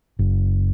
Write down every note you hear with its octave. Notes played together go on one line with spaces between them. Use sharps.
F#1